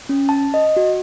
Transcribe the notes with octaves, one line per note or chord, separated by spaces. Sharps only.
C#4
A5
D#5
F#4